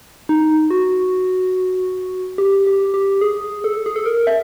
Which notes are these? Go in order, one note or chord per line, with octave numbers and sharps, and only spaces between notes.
D#4
F#4
G4
G4
G4
G#4
A4
G#4
A4
A#4
E5